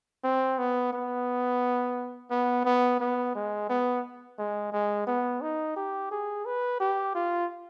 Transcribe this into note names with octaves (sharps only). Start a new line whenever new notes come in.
C4
B3
B3
B3
B3
B3
G#3
B3
G#3
G#3
B3
D#4
G4
G#4
B4
G4
F4